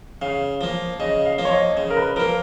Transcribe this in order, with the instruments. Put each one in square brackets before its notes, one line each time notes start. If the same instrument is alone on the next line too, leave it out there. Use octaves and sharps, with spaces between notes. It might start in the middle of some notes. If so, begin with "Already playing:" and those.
[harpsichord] C#3 [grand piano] F5
[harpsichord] F3 A#3
[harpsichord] C#3 [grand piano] D#5
[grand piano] F5
[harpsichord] F3 A#3
[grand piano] C#5
D#5
[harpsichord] C#3
[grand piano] A#4
B4
[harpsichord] F3 A#3 [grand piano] A#4